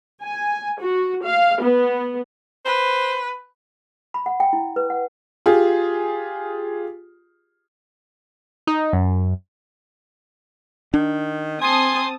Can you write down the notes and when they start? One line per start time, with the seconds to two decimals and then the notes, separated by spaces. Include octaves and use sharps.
0.22 G#5
0.81 F#4
1.25 F5
1.62 B3
2.65 B4 C5
4.14 B5
4.26 F#5
4.40 G5
4.53 E4
4.76 B4
4.90 F#5
5.46 F4 G4 G#4
8.67 D#4
8.93 F#2
10.94 D#3 D4
11.62 C4 G#5 A5 C6 D#6